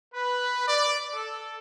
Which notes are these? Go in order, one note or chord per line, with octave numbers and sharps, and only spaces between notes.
B4
D5
A4